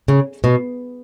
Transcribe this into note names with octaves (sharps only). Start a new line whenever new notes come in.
C#3
B2